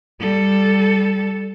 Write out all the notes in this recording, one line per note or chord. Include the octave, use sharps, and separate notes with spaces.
G3 A4